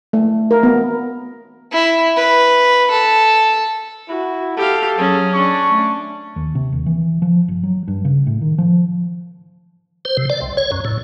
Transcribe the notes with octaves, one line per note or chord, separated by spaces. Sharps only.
A3
A#4
B3
E4
B4
A4
E4 F#4
G4 A4 F5
F#3 C#4 G#4
C#4 D4 C#6
A3
D#2
C3
D#2
E3
F3
G1
F#3
G2
C#3
A2
D#3
F3
C5
C3
D5
C2
C#5
F#2
A2